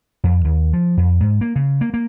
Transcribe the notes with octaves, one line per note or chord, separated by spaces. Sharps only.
F2
D#2
F3
F2
G#2
A#3
C#3
A#3
A#3